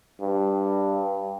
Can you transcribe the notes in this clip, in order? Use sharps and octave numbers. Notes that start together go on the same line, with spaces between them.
G2